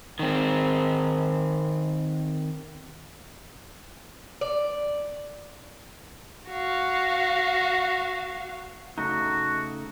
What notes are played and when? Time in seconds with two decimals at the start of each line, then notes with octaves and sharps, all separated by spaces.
0.19 D#3 C4
4.41 D5
6.49 F#4 F5
8.98 C#3 A3 D#4 F#4